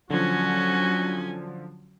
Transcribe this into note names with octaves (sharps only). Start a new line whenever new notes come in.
D3 F3 F#3 C#4 F#4 G#5